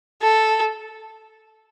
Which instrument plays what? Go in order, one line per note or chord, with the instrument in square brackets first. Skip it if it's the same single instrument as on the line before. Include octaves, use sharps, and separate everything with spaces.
[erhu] A4